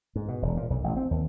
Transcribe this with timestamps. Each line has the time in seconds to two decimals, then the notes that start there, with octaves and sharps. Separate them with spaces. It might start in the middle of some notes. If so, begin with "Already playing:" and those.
0.16 G#2
0.28 B2
0.42 E1
0.57 A#2
0.70 B1
0.84 A1
0.96 C4
1.11 D#2